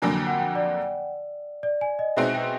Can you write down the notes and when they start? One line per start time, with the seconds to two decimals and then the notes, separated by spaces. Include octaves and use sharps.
0.02 F2 D3 F#3 A#3 G#5
0.14 G5
0.27 F#5
0.40 G5
0.55 D5
1.63 D5
1.81 G#5
1.99 D#5
2.17 B2 G#3 C4 D#4 F#4 E5
2.35 G5